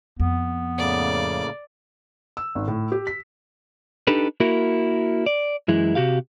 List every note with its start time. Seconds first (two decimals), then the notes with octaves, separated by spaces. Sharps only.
0.20 F2 B3
0.78 A2 C#3 A#3 D5
2.37 E6
2.55 G#1
2.67 A2
2.92 G4
3.07 B6
4.07 D4 D#4 G4 A4 B4
4.40 A#3 E4 F#4 A#4
5.26 D5
5.68 F#2 E3 G#3 E4
5.95 C3 F#4 G4 F5